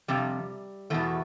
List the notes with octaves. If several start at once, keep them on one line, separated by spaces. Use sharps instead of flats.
F2 C3 G3
E2 B2 A3